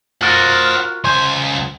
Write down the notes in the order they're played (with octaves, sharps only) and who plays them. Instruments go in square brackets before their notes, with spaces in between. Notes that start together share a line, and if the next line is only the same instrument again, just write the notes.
[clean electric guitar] F4 F#4 A#4 [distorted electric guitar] C5 F#5
[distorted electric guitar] C#2 G#5 [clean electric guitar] C5